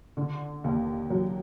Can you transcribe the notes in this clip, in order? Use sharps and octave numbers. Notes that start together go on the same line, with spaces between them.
D3
D#2
F#3